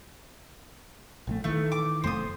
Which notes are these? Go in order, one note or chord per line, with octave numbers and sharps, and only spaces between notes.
A#1 D3 A3
D#3 E3 A3
D6
F1 F2 A3 C5 D#6